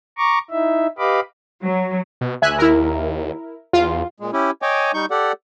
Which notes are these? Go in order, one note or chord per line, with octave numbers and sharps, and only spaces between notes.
A#5 C#6 D6
D#4 E4 E5
G4 B4 D#5 F5 B5 D6
F#3
B2
D2 E5 G#5 F#6
D#2 E4 A#4
E2 F4
A#2 G#3
C#4 E4 G4
C#5 D#5 G5 G#5 D6
G3 D#4 C#6 G6
G4 A4 D5 F#5